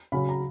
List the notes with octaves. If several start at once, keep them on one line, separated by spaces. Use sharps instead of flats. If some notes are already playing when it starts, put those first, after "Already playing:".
C#3 F#3 C#4 B5
A#5